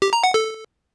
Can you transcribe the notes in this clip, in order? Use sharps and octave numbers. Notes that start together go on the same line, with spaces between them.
G4
A#5
F#5
A4